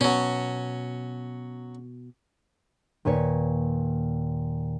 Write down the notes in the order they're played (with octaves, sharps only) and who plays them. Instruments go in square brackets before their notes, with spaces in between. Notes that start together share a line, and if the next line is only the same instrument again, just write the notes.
[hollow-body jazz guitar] B2 [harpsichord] F#3 C#4
[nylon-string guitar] D#2 A#2 B4 C#5